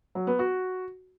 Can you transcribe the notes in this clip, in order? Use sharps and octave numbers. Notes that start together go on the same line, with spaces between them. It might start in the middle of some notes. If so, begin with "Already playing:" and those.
F#3
B3
F#4